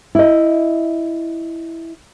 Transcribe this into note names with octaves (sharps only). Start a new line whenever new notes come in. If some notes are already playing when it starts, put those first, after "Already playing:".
E4 D#5